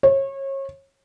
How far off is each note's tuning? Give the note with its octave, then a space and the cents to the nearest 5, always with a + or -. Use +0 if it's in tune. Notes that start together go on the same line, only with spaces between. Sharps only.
C#5 -30